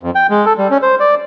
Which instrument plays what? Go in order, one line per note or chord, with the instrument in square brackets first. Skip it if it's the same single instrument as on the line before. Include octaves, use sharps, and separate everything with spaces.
[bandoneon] F2
G5
G#3
A4
G3
C#4
C5
D5